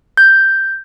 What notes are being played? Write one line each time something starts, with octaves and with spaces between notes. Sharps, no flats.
G6